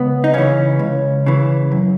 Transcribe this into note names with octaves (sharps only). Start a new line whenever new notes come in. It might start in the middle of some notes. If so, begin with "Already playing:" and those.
Already playing: C#2 B3
D#4
C#3 E3 C#4
C#2
C#3 E3
F#2